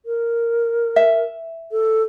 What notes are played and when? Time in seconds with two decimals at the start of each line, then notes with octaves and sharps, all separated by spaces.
0.06 A#4
0.96 E5
1.72 A4